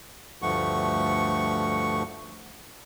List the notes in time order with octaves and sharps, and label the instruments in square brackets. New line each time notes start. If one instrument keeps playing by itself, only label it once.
[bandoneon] D2 G2 F3 A3 F#5 C#6